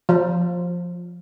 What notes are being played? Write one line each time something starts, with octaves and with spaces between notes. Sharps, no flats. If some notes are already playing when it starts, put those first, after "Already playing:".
F3